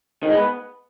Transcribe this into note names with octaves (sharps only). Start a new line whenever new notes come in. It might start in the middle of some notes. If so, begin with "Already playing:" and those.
D#3
G#3
B3